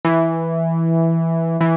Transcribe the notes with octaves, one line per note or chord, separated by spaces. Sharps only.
E3
E3